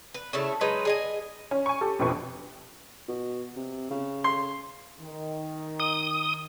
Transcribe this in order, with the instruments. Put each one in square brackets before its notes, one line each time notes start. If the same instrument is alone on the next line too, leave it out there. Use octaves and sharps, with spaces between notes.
[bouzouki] B4
C#3 A3 E4 E5
F#3 G#3 D#4 B4
G#4 D#5 G#5
[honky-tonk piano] C#4
G#5 C#6
G4 A4
A#1 F2 B2 B4 C#6
[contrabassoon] B2
C3
C#3
[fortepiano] C6
[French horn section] D#3
[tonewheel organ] D#6